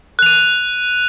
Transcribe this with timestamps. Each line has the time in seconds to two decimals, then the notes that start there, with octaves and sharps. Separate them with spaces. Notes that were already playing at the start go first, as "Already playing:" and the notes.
0.19 F#6
0.22 F7
0.26 D#7